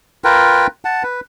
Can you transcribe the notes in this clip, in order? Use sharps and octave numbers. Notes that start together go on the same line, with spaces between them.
F4 A#4 B4 G5
F#5 A5
B4